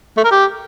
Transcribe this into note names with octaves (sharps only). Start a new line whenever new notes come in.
A3
A#4
G4